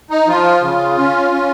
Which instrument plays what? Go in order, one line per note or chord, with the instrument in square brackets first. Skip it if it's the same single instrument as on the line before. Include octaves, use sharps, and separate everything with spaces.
[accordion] D#4
F3 F4
C#3
C#4
C#4